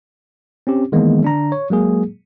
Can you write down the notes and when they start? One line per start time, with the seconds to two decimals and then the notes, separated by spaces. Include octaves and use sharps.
0.67 C4 C#4 G4
0.92 D#3 E3 G#3 A#3 B3
1.22 D3 D4 A#5
1.52 C#5
1.70 F#3 G#3 A#3 G#4